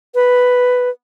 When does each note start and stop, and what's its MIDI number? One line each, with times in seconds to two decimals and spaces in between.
0.15 0.90 71